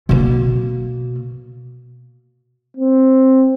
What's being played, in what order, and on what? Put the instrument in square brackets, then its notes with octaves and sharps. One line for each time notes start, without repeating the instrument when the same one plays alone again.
[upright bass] B2 A#3
[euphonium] C4